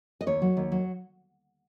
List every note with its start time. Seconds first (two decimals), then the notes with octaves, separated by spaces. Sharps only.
0.21 D#5
0.27 D#2 C#5
0.42 F#3
0.57 D#2
0.72 F#3